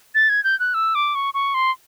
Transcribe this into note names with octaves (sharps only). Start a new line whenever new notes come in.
A6
G#6
G6
F#6
E6
D6
C#6
C#6
C6